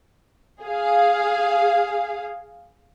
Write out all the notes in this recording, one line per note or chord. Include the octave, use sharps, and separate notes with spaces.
G#4 F5